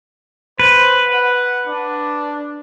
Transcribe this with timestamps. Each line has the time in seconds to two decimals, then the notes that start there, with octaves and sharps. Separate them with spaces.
0.59 B4 C5
1.08 F#5
1.67 D4